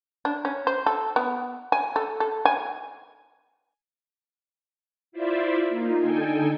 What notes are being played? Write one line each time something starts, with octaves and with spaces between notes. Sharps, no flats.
D4
C#4
C5
A4
B3
G#5
A4
A4
G#5
E4 F4 C5 D5 E5
A#3 D#4 F4
D3 D#4 A4 G5 G#5